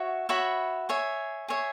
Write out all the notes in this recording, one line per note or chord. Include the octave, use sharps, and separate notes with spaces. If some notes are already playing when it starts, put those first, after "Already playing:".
Already playing: F#4 C#5 E5
F#4 C#5 E5 B5
G#4 C#5 E5
G#4 C#5 E5